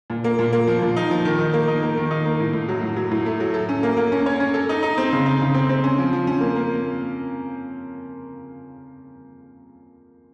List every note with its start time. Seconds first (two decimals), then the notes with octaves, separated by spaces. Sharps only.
0.10 A#2
0.24 A#3
0.39 A#2
0.53 A#3
0.67 F3
0.82 A#2
0.96 D#4
1.11 F3
1.25 D#3
1.39 D#4
1.53 A#3
1.68 D#4
1.83 A#3
1.97 D#3
2.11 D#4
2.25 A#3
2.40 A2
2.53 A2
2.68 F#3
2.82 A2
2.96 F#3
3.11 A2
3.26 A3
3.40 F#3
3.54 A4
3.69 C#4
3.83 A#3
3.97 A#3
4.12 C#4
4.26 C#5
4.40 C#4
4.54 A4
4.69 D#4
4.83 D#4
4.98 C4
5.13 C#3
5.26 D#4
5.41 C#3
5.54 C4
5.69 C4
5.84 C#4
5.98 F3
6.13 F3
6.27 C#4
6.40 A#3
6.55 A#3